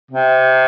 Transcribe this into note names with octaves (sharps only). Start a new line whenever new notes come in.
C3